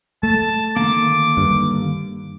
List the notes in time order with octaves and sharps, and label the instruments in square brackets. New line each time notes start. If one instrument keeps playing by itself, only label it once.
[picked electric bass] A3 [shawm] A5
[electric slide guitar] D3 D#3 A#3 [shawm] D6
[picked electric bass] G2